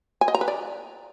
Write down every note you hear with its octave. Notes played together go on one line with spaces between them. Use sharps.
G#5
D#5
A#5
B4
D5